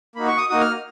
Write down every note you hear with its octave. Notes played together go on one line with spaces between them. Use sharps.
A#3 D#4 F#4 B5
C#6
D#6
A#3 D#4 F#4 D#6
F6